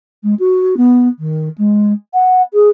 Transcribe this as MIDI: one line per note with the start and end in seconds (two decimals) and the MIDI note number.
0.23 0.34 56
0.39 0.74 66
0.77 1.09 59
1.19 1.49 51
1.58 1.93 56
2.14 2.42 78
2.54 2.69 68